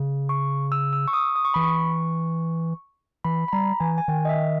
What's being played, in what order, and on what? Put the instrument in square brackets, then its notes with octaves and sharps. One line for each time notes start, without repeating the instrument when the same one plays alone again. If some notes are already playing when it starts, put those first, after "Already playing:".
Already playing: [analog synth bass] C#3
[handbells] C#6
E6
E6
C#6
D#6
D#6
C#6
[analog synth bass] E3 [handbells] B5
[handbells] C#6
[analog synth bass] E3 [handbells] B5
[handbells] B5
[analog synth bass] G3 [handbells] A#5
[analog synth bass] E3 [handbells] G#5
[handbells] G#5
[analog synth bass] D#3 [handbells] G5
[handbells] D#5
E5